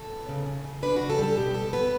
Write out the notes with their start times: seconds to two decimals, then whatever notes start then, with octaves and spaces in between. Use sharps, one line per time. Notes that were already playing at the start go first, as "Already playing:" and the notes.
Already playing: A4
0.10 B3
0.29 C#3
0.46 C#3
0.64 C#3
0.83 D4 B4
0.96 F#4
1.01 C#3
1.10 A4
1.18 G3
1.23 A4
1.37 B2 G4
1.54 G3 A4
1.73 B3 B4